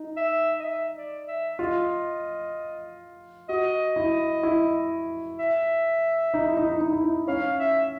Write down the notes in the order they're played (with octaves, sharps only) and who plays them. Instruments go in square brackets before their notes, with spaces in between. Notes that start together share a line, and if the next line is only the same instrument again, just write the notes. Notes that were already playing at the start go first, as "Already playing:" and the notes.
Already playing: [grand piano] D#4
[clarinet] E5
D#5
E5
D5
E5
[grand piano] F4 [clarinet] D#5
[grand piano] F#4 [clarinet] D#5
[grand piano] E4
E4
[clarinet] E5
[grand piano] D#4
E4
D#4
E4
D#4
E4
D#4
[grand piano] C#4 [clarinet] F5
[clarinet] E5